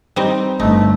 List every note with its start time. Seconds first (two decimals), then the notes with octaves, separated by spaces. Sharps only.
0.16 G3 C4 D#4
0.60 G1 A3 D#4